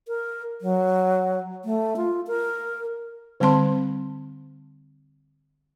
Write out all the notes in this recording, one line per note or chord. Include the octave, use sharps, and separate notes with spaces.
A#4
F#3
A3
F4
A#4
D3 G3 C4 A5 C6